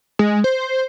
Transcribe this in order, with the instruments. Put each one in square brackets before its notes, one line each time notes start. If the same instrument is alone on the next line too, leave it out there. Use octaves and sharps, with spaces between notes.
[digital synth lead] G#3
C5